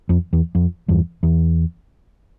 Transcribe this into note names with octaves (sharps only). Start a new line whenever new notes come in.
F2
E2
F2
E2 G2
E2